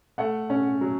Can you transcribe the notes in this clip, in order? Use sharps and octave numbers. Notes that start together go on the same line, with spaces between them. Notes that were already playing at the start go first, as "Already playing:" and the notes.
A3 F#5
C#4
F#3